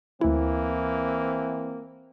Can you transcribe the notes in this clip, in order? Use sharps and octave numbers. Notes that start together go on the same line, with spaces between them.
D2 E3 A#3 C4 E4